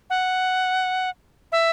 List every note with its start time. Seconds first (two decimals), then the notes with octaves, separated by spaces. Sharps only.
0.10 F#5
1.52 E5